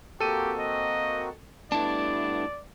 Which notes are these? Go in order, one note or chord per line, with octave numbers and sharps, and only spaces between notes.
A#3 C4 F#4 G4 A4 D#7
D#5
G2 A3 B3 D4 E4 D5 A5